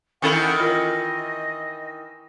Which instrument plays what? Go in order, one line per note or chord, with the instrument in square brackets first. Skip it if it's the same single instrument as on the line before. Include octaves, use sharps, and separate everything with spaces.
[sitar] D#3 E3 E4 [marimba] C#4 A4 [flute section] A#4 F#5 B5
[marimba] F4 A#4 [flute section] D#5